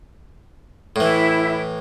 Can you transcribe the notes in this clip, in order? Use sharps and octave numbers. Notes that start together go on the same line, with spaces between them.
A2 E3 E4